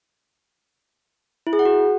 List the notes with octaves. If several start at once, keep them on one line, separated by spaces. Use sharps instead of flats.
E4
G#4
F#5
F#4